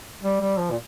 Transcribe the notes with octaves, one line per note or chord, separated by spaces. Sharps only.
G3
G3
F3
A#2